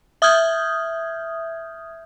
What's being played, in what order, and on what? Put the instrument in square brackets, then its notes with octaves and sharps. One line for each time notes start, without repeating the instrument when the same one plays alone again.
[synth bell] E5 D#6 F6 G6 G#6